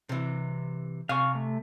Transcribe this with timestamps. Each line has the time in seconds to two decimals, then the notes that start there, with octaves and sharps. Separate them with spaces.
0.09 C3 E3
1.09 C3 F5 G#5 C#6
1.35 A3